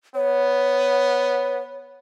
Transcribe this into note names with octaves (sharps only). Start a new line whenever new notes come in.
B3 C#5